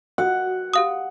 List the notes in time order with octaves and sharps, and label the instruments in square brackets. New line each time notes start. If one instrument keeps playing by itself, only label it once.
[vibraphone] F#4 [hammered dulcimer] F#5
[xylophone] G4 F5 D#6